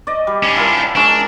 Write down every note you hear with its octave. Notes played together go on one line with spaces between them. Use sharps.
D5 D#5
G3
C#4 D4
E4 F4 A#4
G5
G#3 C#4 D4 A#5